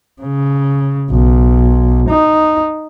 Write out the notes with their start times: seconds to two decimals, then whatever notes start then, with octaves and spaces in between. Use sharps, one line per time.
0.22 C#3
1.10 B1
2.09 D#4